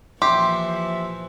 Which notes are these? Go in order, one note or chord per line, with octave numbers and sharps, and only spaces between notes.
A#2 E3 F3 G4 E5 C6